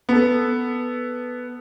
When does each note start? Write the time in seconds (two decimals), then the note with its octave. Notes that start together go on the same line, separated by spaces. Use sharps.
0.09 B3 A4